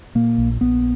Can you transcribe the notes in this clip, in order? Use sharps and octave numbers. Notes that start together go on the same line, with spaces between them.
A#2 A#3
A#1
A#1 B3